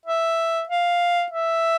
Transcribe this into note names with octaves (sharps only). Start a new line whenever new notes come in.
E5
F5
E5